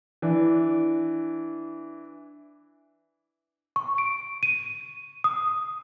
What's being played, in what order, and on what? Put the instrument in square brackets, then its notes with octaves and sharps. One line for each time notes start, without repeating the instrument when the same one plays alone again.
[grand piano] E3 D4
[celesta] C#6
D7
D#7
D#6